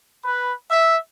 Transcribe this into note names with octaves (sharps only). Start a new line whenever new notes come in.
B4
E5